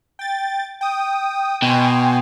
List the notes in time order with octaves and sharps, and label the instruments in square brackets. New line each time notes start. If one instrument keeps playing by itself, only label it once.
[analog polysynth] G5 A6
G5 D#6
[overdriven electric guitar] B2 [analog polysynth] G5 G#5 C6